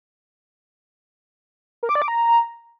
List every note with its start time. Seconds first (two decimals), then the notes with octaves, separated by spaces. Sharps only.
1.83 A#4
1.89 D6
1.95 D5
2.02 D6
2.08 A#5